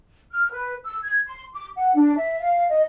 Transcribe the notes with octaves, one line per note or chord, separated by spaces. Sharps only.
F6
B4
E6
G#6
C6
D6
F#5
D4
E5
F5
D#5